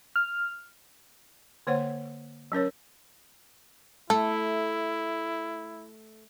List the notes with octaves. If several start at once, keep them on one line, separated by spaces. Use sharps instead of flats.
F6
D3 A#3 C5 C#5 F#5
F#3 C#4 A#4 C#5
A3 E4 A4